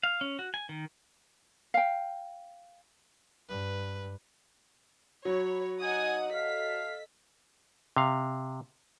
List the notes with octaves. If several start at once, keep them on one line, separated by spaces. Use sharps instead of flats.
F5
C#4
F#4
G#5
D#3
F5 G5
G2 B4
F#3 C#5 B5
D#4 D#5 F#5 G#5 D#6
A4 F5 B6
C3 F5